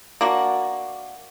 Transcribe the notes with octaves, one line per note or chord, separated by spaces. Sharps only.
A#3 D4 F#4